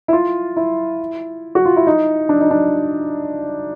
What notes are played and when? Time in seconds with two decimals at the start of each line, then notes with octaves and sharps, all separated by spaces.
0.08 E4
0.13 F4
0.57 E4
1.55 F#4
1.65 F4
1.77 E4
1.87 D#4
2.29 D4
2.41 D#4
2.51 D4